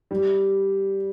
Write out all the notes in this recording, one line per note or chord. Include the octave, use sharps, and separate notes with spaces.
G3